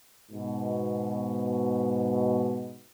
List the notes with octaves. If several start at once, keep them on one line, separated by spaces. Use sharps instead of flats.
G#2 B2